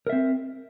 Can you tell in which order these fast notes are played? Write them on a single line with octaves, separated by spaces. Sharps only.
A#4 E5 C4